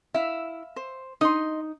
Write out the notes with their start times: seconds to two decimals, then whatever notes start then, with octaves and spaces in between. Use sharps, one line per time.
0.14 E4 E5 F5
0.76 C5
1.21 D#4 D#5 C6